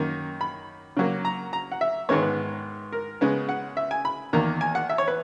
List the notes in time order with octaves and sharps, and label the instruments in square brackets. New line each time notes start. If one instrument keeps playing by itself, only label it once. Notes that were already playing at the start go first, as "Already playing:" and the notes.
Already playing: [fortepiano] F#2 D#3 A#3
B5
C#3 F#3 A#3
A#5
A#5
F#5
E5
G#2 D#3 G#3 B3 C#5
B4
A#4
C#3 G#3 B3
F#5
E5
G#5
B5
E2 D#3 A#3 A#5
G#5
F#5
E5
C#5
B4